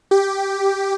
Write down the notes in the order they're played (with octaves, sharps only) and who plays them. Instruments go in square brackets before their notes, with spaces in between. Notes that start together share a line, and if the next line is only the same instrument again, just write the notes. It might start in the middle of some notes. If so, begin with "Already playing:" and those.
[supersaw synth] G4